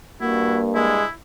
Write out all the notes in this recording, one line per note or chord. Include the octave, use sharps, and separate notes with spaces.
G2 A#3 E4 F#4
G#3 E4